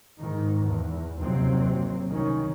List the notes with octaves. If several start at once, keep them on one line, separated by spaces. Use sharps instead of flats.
G#2 D#3
E2
F#1 D#2 C3 F#3 C4
C2 D#3 C#4